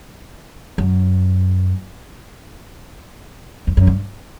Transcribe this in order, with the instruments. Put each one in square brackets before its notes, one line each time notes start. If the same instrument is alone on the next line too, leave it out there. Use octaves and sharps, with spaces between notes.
[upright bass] F#2
F2
F#2
G2